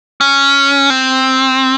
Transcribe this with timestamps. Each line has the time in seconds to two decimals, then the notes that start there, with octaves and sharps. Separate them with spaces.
0.21 C#4
0.90 C4